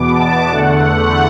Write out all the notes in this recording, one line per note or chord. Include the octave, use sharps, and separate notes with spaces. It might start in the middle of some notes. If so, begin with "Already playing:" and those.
Already playing: E2 B2 B3 D6
A5
E2 D3 A3 F#5